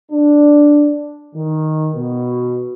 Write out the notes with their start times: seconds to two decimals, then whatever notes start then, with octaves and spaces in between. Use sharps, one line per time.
0.11 D4
1.34 D#3
1.94 B2